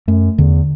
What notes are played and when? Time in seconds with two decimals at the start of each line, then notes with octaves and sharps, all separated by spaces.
0.08 F#2 A3
0.38 E2 D3